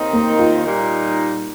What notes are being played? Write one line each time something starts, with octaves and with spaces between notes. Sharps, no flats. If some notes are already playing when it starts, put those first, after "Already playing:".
Already playing: D#2 D#3 C4 D#4
A#3
F4
A#2 G3 D#4